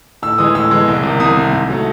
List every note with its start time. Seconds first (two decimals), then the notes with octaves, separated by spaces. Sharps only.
0.22 A2 E6
0.38 E3 G#3 D#6
0.55 A2 E6
0.71 E3 G#3
0.88 C2
1.03 C3 D#3
1.20 C2 D#6
1.36 C3 D#3
1.53 G#2
1.70 F#3 A3